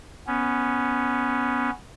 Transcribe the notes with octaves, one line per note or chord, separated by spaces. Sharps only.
B3 C#4